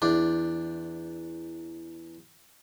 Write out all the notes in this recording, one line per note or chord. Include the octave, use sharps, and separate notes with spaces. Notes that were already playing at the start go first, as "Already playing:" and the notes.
E2 D4